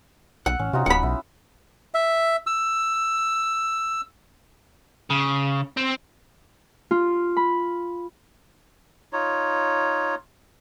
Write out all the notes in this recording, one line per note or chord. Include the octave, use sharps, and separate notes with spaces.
B1 F#5 E6
A1 C#4
C3 D#4 F4 F#4
D1 F#5 B5
B1 E4
E5
E6
C#3
C4
F4
B5
D#4 F4 C#5